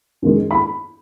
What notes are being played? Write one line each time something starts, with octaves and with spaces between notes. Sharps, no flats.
F#2 D#3 G#3
B5